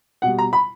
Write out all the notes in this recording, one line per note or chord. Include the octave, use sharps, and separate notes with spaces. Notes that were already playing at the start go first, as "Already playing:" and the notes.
B2 G3 F#5
A#5
B5